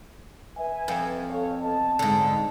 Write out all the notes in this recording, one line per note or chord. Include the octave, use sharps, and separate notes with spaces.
B4 E5 G#5
F2
A4 C#5 F5
B3 D#5 A5
G#2 D3